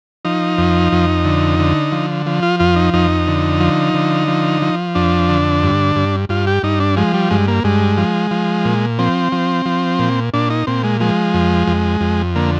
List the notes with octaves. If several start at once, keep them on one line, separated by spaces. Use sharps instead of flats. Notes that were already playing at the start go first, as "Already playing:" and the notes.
F3 D#4
F2
F2
D3
D3
F3
F3
F4
F2 F4
D#4
F2 D#4
D3
F3
D3
F3
F3
F2 D4
D3
G2
G2
G2 F4
G4
G2 D#4
D4
F3 G#3
G3
G2 G#3
A#3
G2 G#3
F3
F3
A#2
F3 C4
F3
F3
A#2
A#2 D4
D#4
A#2 C4
G#3
F3 G#3
F2
F2
F2
D3 A#3